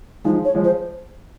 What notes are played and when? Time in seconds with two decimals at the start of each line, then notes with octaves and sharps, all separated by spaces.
0.24 F3 G#3 D#4
0.45 C#5
0.54 F3 G#3
0.64 C5